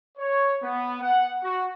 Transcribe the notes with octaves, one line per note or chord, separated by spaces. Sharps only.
C#5
B3
F#5
F#4